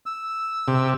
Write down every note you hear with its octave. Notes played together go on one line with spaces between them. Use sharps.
E6
C3